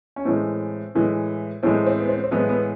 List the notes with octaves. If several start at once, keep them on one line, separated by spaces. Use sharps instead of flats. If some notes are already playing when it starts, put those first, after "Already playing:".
C#4
A2 E3 G#3 C4
A2 E3 G#3
A2 E3 G#3 C4
C4
B3
C4
C4
A2 E3 G#3 B3
B3